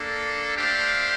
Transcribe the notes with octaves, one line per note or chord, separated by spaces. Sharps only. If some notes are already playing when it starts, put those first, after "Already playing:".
Already playing: A#3 D4 A4
A3 D4 G4 C5 F5